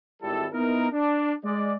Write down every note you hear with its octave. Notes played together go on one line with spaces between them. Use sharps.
G#1 G3 E4 A4
B3 D#4 E4 A#4
D4
G#3 D5